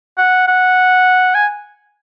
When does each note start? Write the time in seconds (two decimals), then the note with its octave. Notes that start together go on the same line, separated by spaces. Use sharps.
0.18 F#5
0.48 F#5
1.35 G#5